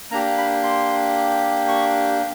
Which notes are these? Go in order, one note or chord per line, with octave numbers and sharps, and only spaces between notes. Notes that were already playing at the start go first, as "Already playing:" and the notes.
A#3 D4 G4 A#5
B5
C6
C#6